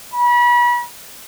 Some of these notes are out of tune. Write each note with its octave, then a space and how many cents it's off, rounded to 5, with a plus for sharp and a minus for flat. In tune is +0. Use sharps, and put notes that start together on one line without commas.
B5 -35